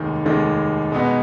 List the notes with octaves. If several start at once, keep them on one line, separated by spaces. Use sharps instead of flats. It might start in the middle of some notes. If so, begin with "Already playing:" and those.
Already playing: F1 D#2 D#3 G#3
F1 D#2 D#3 G#3
B2 G#3 B3 D#4